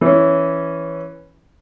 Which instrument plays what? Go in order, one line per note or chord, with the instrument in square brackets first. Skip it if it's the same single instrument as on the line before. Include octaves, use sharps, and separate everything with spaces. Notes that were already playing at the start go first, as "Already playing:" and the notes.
[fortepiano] E3 C#4